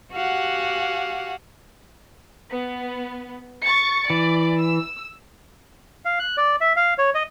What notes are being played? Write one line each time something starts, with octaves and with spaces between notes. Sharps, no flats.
F#4 G4 F5 F#5 G#5
B3
C#6 A6 C#7
E3 D5
E6
F5
F#6
D5
E5
F5
C#5
D#5